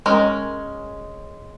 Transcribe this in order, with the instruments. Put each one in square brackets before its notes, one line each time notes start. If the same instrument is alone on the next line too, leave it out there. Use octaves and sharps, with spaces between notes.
[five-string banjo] G#3 C#4 A#4